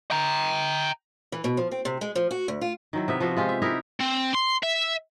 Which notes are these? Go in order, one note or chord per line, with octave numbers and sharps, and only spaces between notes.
G5 A#5
E3
B2
F3
C4
C3
G#3
F3
F#4
D2
F4
D#3 F#3 E4
C3 B3 E5
F3 F4 F#4 E5
G#3 F4 G4
E5
D#4 E4 G4 A#4
C4
C6
E5